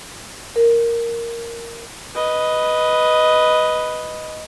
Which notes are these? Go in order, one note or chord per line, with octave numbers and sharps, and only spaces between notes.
A#4
B4 D#5